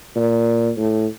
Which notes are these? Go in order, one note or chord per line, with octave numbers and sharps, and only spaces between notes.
A#2
A2